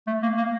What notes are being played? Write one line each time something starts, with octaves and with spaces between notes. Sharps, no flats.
A3
A#3
A#3